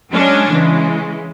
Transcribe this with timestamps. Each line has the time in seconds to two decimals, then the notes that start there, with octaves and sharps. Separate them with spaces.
0.11 F#3 G#3 C#4 D4
0.49 C#3 E3 G#3